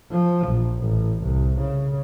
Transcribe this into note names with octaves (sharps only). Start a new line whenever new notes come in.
F3
A#1
A1
C2
C#3